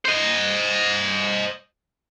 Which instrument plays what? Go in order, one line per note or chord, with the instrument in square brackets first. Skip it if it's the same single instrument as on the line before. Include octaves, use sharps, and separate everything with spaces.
[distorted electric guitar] C5 D#5